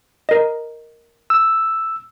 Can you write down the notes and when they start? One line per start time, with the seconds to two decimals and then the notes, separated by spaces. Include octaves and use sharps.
0.29 A#4 D#5
1.30 E6